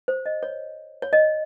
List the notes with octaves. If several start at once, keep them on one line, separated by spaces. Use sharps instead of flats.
C5
D#5
C#5
C#5
D#5